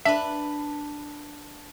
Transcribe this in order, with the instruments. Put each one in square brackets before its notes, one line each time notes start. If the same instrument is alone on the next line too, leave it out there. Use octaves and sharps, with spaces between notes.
[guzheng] D4 B4 [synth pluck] E5